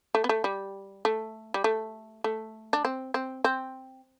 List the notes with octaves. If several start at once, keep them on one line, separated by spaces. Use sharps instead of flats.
A3
B3
A3
G3
A3
G3
A3
A3
D4
C4
C4
C4